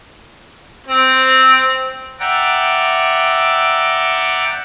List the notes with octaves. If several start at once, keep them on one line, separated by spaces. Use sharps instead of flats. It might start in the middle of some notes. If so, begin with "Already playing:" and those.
C4
D5 E5 F#5 G5 A#5